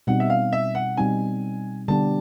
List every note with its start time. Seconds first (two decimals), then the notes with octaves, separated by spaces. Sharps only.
0.07 B2 G3 C4 D#4 F#5
0.20 E5
0.30 F5
0.53 E5
0.75 F#5
0.97 B2 G3 C4 D#4 G#5
1.88 D3 G3 B3 D4 G4 A5